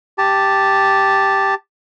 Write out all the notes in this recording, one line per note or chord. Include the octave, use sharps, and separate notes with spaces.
G4 A5